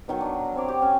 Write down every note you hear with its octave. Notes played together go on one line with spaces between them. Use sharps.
B2 D#3 F#3 C#6
D4
A#4
C4 C#5 D5
G4
C#4